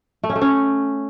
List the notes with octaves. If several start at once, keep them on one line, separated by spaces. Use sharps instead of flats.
A3
C#4
A3
C#4